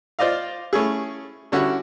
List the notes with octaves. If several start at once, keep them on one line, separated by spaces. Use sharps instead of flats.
F4 C5 D5 D#5 F5
A3 C#4 E4 G#4
D3 G3 C#4 E4 F#4